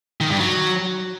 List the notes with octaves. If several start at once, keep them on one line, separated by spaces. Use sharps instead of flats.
D#3
G2
F#3